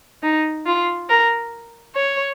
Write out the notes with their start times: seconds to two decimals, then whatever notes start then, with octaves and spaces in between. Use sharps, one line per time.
0.23 D#4
0.66 F4
1.09 A#4
1.95 C#5